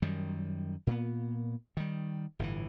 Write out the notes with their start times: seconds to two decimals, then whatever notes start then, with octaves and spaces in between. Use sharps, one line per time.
0.02 F#2 D#3 G3
0.87 A#2 A#3 B3
1.77 D#3 G3
2.39 G1 A2 C3 E3